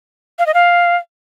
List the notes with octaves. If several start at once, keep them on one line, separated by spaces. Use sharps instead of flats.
F5
D#5
F5